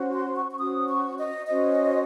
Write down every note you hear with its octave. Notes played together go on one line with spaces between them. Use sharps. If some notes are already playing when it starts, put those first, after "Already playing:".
Already playing: C#4 F#4 C5
C6
C#6
C#6
C#4 F#4 C5 D#6
C#6
D#5
C#4 F#4 C5 D#5